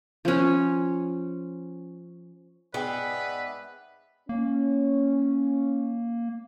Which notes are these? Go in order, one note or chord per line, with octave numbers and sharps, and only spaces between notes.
F3 C#4
G#2 B3 G#4 B4 D5 E5 G5
A#3 C#4